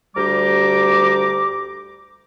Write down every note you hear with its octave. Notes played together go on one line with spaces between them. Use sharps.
D2 G3 G4 A#5 D6